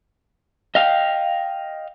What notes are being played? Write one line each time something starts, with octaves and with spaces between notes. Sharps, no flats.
D#5 F5 G5